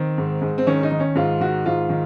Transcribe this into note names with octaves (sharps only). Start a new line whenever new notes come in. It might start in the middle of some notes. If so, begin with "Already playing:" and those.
Already playing: D#3 C4
G#2
G#2
C4
D#3 C#4
D#4
D#3
C#4
G#2 F4
D#3 F#4
G#2 F4
D#3